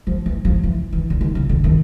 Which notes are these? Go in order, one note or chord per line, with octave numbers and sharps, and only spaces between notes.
F3
E3
F3
E3
E3
D3
D#3
C#3
D3
D#3